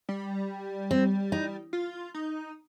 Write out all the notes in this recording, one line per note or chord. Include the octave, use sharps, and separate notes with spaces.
G3
C4
D#4
F4
D#4